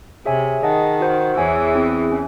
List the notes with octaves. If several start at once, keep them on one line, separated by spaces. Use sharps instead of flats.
C3 G#4 C#5 E5 G#5
D#3 G#4 D#5 F#5 A5
F#4 C5 F#5
E2 E3 G#4 C#5 G#5
C4 E4 G#4
C#4